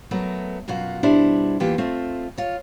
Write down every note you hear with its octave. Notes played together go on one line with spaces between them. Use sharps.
F#3 A3 B3 A#4
F#2 B2 F4 F#4
B2 G3 D4 E4 C5
E2 E3 A#3 F4 G4
A3 C4 F4
F4 C#5